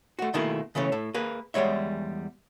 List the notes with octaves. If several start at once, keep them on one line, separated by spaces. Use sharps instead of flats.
A3 F#4
B2 D#3 A3 A#3 E4 G#4
C#3 E3 A3 C#4
A2 A4
A#3 G#4 B4
E2 G3 G#3 C#5 E5